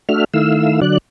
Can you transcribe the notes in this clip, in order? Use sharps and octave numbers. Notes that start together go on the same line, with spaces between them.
A3 D4 F#4 E5 F6
D#3 A3 E4 F5 E6
D3 F#3 D5 F#6